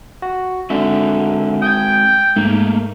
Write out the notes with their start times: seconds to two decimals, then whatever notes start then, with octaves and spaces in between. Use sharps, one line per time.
0.22 F#4
0.70 D3 G#3 C4 F#4 E5
1.62 G5 D#6 G6 G#6
2.36 G#2 A3 A#3